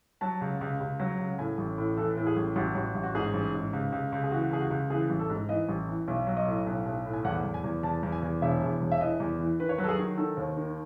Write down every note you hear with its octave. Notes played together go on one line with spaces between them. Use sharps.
F#3 A5
C#2
C#2
C#2
F#3
C#2
A2 G#5
A1
A2
E3 A4
A2
G#4
A1
A1 F#4
A1 F#4
A1
F#4
G#2 G#4
A1
G#2
C#2
C#2
C#2
G#4
E3 F#4
C#2 G#4
F#4
C#2
E3 G#4
A1
A4
G#2
E3 D#5
A1
E3
B1
F#3
D#5
A2
B1
B1
A2
G#5
E2 F#5
E2
G#5
E2
E2 A5
E2
G#5
E2
E1 E5
E2
E1
E5
E3 D#5
E2
E3
D#3 B4
C#5
F#3 B4
A4
G#4
D#3
D#3 A4
D#2
D#3